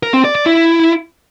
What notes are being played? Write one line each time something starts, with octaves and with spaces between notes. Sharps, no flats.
A#4
C4
D5
D5
E4